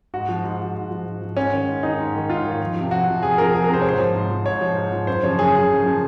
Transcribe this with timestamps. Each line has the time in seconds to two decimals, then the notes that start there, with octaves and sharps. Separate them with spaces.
0.14 G#2 F#4
0.29 F3
0.44 G#2
0.60 F3
0.75 G#2
0.91 F3
1.06 G#2
1.22 F3
1.37 G#2 C#4
1.52 D#3
1.68 G#2
1.83 D#3 D#4
1.99 G#2
2.14 D#3
2.29 G#2 F4
2.45 D#3
2.61 F2
2.76 C3 F3
2.91 F2 F#4
3.07 C3 F3
3.22 F2 G#4
3.38 C3 F3 A#4
3.53 F2 G#4
3.64 A#4
3.69 C3 F3 C5
3.81 C#5
3.84 G#2 C5
3.99 F3
4.15 G#2
4.31 F3
4.46 G#2 C#5
4.61 F3
4.77 G#2
4.92 F3
5.07 F#2 C5
5.23 C#3 F3 C#5
5.38 F#2 G#4
5.54 C#3 F3
5.69 F#2
5.85 C#3 F3